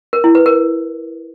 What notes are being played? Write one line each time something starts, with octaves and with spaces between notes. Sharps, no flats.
A#4
E4
B4
A#4